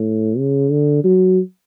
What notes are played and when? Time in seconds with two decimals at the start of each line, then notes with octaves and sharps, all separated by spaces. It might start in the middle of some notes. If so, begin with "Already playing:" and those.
Already playing: A2
0.38 C#3
0.71 D3
1.04 F#3